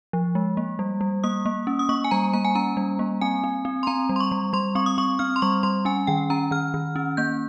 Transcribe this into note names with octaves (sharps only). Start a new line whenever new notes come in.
F3
G#3
A#3
G3
G3
A#3 D#6
A#3
C#4
D#6
A#3 C#6
G#5
G3 A#5
A#3 A#5
G#5
C#4 A#5
G3
A#3
C4 G#5
C4
C4
C6
C4 A#5
G3
C6
C#6
G3
G3 C6
C4 C#6
D#6
C4 C#6
C4 F6
C6
G3 C#6
G3 C6
C#4 G#5
D#3 G5
C#4 A#5
D#3 F6
D#3
C#4
A#3 G6